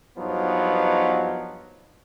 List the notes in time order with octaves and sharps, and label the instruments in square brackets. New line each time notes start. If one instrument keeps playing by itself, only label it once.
[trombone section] G2 F3 F#3 B3 D#4